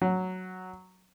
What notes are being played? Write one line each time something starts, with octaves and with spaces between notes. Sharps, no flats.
F#3